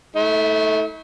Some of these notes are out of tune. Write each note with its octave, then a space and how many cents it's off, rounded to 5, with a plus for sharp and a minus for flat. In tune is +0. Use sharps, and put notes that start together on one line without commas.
A3 +0 E4 -45